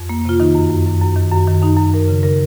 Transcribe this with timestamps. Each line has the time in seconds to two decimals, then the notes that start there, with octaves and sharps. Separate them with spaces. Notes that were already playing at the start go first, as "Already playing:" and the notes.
Already playing: F2
0.09 A#3
0.25 C3 F4
0.40 D#3 D#4
0.55 F#2
0.70 F#2
0.86 F#2
1.02 F#2
1.16 D#3
1.31 F#2
1.47 D#3
1.62 F#2 D#4
1.77 F#2
1.94 F#2 A#4
2.08 C#3
2.23 C#3 A#4